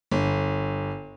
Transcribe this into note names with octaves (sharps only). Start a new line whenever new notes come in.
G1